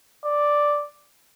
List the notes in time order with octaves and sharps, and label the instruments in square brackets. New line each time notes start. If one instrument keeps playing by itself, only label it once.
[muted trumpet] D5